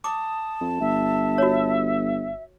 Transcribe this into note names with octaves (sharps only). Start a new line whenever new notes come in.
A5 D6 D#6
F2
G1 E5
F#4 C#5